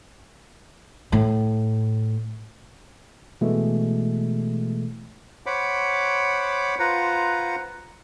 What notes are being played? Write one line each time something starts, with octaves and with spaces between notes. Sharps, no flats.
A2
B2 E3 G#3 A3
C5 C#5 F#5 B5 D6
F4 B4 C5 F#5 A#5